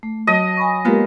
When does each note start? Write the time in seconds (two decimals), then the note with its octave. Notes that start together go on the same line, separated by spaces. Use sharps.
0.03 A3
0.27 F#3 D#5 A5
0.57 G#5 B5 C#6
0.85 G#3 A#3 B3 F4 G4 A#4